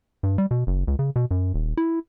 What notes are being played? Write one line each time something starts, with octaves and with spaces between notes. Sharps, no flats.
G2
G3
B2
F#1
C#2
C#3
B2
F#2
D#1
E4